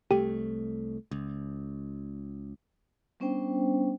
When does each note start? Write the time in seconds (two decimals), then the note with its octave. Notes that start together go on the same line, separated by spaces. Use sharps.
0.11 C2 A3 G4
1.11 C#2
3.20 G3 B3 C#4 D4 C5 G5